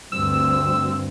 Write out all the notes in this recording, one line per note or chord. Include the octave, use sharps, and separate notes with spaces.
D2 G2 C4 E6